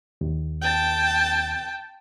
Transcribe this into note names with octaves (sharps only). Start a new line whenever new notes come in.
D#2
G5 A5